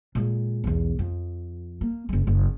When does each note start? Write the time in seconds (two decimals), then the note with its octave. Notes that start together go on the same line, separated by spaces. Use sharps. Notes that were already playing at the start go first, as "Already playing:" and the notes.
0.15 A#2 G#3
0.64 B1 E2
0.99 F2
1.81 A#3
2.09 F#1 G#3
2.27 F#1